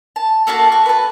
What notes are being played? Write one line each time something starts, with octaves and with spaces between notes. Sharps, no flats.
A5
A3 A#3 F#4 A5
F#4
B4 A5